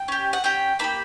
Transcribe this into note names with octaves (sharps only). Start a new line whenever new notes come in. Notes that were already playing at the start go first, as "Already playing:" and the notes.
Already playing: G5
C#4 G4
F#5
C#4 G4 G5
A#3 D4 G4 B5